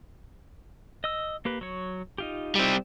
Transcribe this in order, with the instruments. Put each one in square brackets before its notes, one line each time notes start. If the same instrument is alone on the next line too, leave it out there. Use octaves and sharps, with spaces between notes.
[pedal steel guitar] D#5 E6
A#3 G4 B4
F#3 C#5
D#4 F4 G4
[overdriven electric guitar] G3 C4